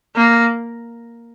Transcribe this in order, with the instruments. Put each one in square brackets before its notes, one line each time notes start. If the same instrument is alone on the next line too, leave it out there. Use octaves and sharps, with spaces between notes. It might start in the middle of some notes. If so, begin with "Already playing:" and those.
[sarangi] A#3